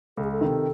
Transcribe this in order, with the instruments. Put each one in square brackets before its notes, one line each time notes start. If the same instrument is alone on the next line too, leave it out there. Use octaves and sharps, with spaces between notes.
[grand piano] C#2 [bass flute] A4
[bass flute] G#4
A4
[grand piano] C3 D#3